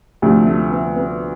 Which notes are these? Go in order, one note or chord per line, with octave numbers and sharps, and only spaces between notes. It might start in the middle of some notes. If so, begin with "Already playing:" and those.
D2 C3 F3 A3
A3
B3
B3